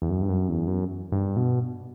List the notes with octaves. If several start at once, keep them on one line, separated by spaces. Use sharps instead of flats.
E2
F#2
G2
F#2
E2
F#2
G2
B2